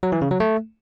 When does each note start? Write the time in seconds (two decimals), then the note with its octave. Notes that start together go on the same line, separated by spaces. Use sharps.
0.03 F#3
0.12 E3
0.22 C#3
0.31 F#3
0.40 A3